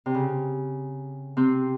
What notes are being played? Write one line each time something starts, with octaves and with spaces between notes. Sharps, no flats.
C3
C#3
C3 C4